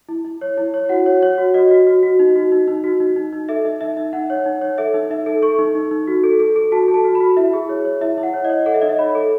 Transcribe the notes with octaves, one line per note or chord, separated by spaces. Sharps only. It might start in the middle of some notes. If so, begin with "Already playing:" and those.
E4
E4
C#5
E4
C#5
F#4 F#5
C#5
C#5
F#4
F#4 D#5
F#4
F#4
F#4
D#4
F#4
D#4
D#4
F#4
D#4
D#4
D#4
A4 E5
D#4
D#4 E5
D#4
D#4 F#5
C#5
D#4
C#5
A4 E5
D#4
D#4 E5
A4
A4 C#6
D#4
D#4
D#4
F#4
A4
A4
A4
F#4 A5
A4
A5
F#4
B5
F#4
E4 E5
G#4
C#5
C#5
E4 E5
E4
F#5
C#5
C#5 D#5
A4 F#5
E5
D#4 D#5
E5
C#5 B5
A4